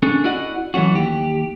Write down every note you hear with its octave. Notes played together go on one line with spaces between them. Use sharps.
C#4 D4 G#4 A4
E4 F#4 D5 D#5 F#5
E3 F#3 A3 C#4 F#4
D#2 G4